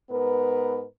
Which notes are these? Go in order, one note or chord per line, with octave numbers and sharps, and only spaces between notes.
G#2 B3 A#4 B4